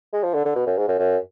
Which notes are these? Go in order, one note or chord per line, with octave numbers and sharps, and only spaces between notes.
G#3
F3
D3
D3
B2
F#2
G#2
F#2
F#2